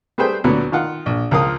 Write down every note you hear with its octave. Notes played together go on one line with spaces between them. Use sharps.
G3 A3 G#4 B4 C5 G5
D2 A#2 F#3 B3
D#3 F4 F#5
A#1
C#2 F3 F4 A#4 F5 D#6